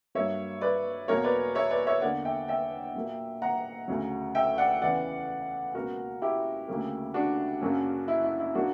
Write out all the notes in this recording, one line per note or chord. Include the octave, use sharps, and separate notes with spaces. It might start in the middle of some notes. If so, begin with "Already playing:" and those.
G2 F#3 A#3 C#5 E5
B4 D5
E2 B2 F#3 A#3 A#4 C#5
B4 D5
C#5 E5
B4 D5
C#5 E5
E2 D3 A#3 D5 F#5
E5 G5
E5 G5
A#2 F#3 A#3
F#5 A#5
D2 C#3 F#3
E5 G5
D5 F#5
E2 C#3 E3 D5 F#5
C#2 B2 A#3 F#4 A#4
E4 G4
D2 C#3 F#3 A#3
D4 F#4
F#2 C#3 F#3 A#3
E4
E4
E4
A#2 F#3 A#3 D4 F#4